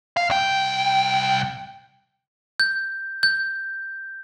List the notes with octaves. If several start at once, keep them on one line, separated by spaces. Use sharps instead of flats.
F5
C2 G5
G6
G6